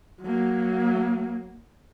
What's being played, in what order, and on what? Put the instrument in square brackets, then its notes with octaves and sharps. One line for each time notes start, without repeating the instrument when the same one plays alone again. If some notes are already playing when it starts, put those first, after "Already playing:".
[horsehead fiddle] F#3 A#3